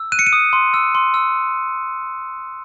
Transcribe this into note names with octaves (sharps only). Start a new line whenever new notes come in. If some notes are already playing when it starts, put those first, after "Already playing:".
Already playing: E6
F#6 D#7
C#7
D#7
D#6
C6
E6
C6
E6